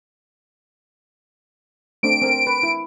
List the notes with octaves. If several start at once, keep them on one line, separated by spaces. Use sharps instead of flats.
A3 C4 D4 D7
C4 A#4
B4
E4